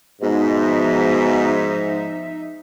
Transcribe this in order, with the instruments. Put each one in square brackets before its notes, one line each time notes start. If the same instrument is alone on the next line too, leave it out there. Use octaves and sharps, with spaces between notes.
[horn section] G#2 [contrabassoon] B2 [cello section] F3 D#4 E5